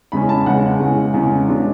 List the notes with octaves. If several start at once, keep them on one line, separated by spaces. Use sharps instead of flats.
E2 C#3 G#3 C#4 B5
A5
E2 C#3 G#3 C#4 F#5
E2 C#3 G#3 C#4
E2 C#3 G#3 C#4
B2 G#3 D4